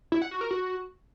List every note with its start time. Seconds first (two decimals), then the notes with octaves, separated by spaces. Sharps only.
0.12 E4
0.22 F#5
0.31 F#4
0.41 A#4
0.51 F#4